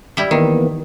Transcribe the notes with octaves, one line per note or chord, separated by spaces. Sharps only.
G3 E4
D#3 E3 A#3 B3